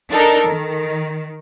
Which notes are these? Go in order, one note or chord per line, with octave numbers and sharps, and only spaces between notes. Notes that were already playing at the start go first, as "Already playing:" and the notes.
D4 D#4 A4 A#4
D#3